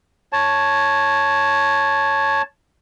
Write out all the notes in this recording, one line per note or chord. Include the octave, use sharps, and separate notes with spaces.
C#5 A5